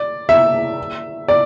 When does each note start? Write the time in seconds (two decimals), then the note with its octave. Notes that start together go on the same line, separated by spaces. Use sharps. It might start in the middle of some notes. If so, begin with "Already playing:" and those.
Already playing: D5
0.29 E5
1.28 D5